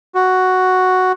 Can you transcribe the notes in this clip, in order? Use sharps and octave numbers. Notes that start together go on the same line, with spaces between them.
F#4